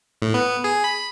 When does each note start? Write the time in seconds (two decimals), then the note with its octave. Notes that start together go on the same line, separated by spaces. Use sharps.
0.22 A2
0.34 B3
0.64 G#4
0.84 B5